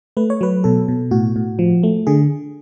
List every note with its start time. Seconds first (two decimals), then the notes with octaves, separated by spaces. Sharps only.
0.17 A3 B4
0.30 C#5
0.41 F#3 B4
0.64 B2 A4
0.88 B2
1.11 A2 F#4
1.36 A2
1.59 F3
1.83 A3
2.07 D3 G#4